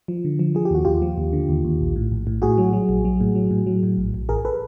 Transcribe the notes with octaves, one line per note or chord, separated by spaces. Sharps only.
F3
D3
F3
F3 G#4
G4
D#2 F#4
D#2 F4 G4
F3
D#2
D3
D#2
D#2
A#1
A2
A#1
A2
A2 F#4 G#4
F#3
F#3
A#1
F#3
A2
F#3
A2
F#3
A2
A#1
A#1
A1 G#4 A#4
A4 B4